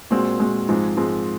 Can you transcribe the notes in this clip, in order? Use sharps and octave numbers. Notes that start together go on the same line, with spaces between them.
A#2 G#3 C4 F#4
A#2 G#3 C4 F#4
G#2 F3 G#3 C4
G#2 F3 G#3 C4